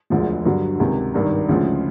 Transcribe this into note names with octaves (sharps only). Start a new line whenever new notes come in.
E1 D2 D3 F3 G#3
G2 D3 F#3
C#2 C3 D#3
G#1 G2 D#3
D2 C#3 F3 G#3